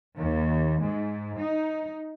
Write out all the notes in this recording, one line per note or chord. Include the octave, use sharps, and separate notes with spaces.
D#2
G#2
D#4